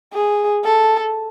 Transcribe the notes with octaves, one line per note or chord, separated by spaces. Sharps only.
G#4
A4